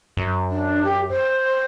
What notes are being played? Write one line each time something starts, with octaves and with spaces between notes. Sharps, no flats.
F#2
D4
G4
C5